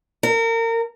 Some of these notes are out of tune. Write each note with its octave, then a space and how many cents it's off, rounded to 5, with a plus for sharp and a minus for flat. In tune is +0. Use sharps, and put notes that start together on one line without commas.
A#4 -30